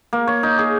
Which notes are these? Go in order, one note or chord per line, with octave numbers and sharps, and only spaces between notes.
A#3
C#5
D#4
G#4